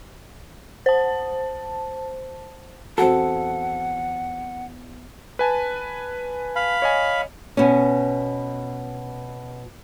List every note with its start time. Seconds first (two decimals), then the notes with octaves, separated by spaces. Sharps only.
0.86 C5 A5
2.98 E2 C4 F#4 A4 F#5
5.39 B4 G#5 A5
6.56 F5 B5
6.82 C#5 D#5 G#5
7.57 B2 C#4